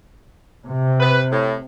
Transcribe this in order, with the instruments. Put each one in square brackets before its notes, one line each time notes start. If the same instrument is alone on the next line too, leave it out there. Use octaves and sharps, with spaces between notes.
[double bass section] C3
[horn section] B4
A2